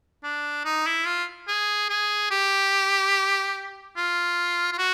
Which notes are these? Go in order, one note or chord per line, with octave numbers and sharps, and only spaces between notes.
D4
D#4
E4
F4
G#4
G#4
G4
F4
F4
F#4